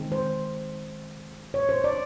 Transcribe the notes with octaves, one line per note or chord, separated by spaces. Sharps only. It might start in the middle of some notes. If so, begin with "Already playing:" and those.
Already playing: D#3 G#3 C4
C5
C#5
C5
D5